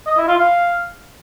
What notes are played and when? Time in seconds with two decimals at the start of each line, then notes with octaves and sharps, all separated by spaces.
0.07 D#5
0.17 E4
0.27 F4
0.38 F5